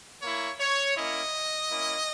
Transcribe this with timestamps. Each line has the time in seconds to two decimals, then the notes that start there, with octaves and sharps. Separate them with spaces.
0.22 A#3 E4 C#5
0.59 C#5
0.96 A#3 C#4 E4 D#5
1.71 A#3 C#4 E4